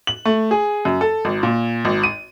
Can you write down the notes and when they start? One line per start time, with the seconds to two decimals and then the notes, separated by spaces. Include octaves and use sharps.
0.07 F#7
0.25 A3
0.51 G#4
0.85 F#2
1.01 A4
1.25 G#1
1.43 A#2
1.85 G#1
2.04 D#7